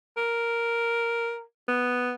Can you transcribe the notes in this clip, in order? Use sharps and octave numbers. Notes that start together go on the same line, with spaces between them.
A#4
B3